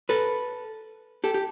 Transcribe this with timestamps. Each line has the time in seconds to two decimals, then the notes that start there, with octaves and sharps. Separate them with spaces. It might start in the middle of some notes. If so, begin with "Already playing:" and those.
0.09 A4 B4
1.24 G4 A4
1.34 G4